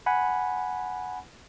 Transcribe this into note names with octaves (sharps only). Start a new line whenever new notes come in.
F#5 G#5 B5